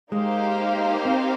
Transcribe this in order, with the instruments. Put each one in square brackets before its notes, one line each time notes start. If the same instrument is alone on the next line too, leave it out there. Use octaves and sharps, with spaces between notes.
[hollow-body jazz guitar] G#3 [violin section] A#3 D#4 G4 C5 F5
[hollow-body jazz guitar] C4